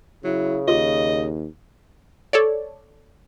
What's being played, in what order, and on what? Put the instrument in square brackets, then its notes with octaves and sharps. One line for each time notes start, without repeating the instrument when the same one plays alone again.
[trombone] C#3 [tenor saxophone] F#3 [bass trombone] E4
[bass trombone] D#2 [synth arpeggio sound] F4 G4 [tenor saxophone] D#5
[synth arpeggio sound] A4 C#5 D5